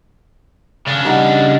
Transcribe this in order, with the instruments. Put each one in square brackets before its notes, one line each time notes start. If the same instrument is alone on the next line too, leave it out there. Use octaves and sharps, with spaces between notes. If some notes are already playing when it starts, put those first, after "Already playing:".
[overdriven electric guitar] C#3 D4
[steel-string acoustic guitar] G3 D#4 F#5